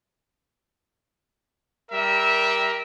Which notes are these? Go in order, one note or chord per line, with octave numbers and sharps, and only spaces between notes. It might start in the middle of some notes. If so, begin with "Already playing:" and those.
G3 A#4 E5